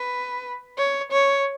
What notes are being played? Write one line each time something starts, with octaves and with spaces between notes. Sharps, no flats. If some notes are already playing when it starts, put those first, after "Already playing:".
Already playing: B4
C#5
C#5